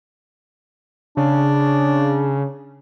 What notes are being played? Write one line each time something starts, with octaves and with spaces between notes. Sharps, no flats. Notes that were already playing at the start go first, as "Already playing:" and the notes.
C#3 D4